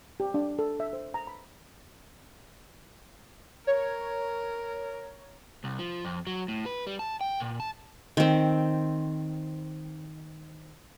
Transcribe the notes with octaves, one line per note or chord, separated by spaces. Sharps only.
G4
D4
A4
E5
C5
A#5
B5
A#4 C#5
C2
F3
F2
F#3
A2
B4
G3
A5
G5
A#2
A5
D#3 C4